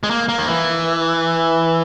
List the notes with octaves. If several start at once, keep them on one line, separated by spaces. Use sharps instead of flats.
G#3
A#3
A#3
D#3
E3